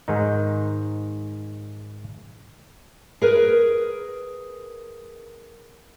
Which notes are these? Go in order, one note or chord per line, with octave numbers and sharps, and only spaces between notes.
G#2 D#3 D#4
G#4 A#4 B4